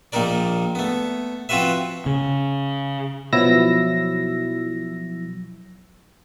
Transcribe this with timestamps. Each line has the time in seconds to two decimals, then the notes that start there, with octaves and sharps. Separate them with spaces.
0.12 A#1 A#2 D#3 D#4 A#4 D5
0.75 A3 B3
1.49 F3 C4 F4 F#4 B4 E5
2.06 C#3
3.33 B2 F3 F#3 E4 E6 A#6